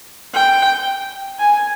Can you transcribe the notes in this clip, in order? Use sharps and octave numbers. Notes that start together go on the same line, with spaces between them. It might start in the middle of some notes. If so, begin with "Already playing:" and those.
G5
G#5